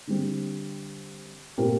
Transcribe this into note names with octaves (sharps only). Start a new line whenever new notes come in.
D3 G3 C4
A#2 A3 C4 G4 A#4